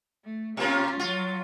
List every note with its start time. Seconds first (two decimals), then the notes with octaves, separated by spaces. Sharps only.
0.25 A3
0.57 B2 A#3 C#4 F4
1.00 F#3 F4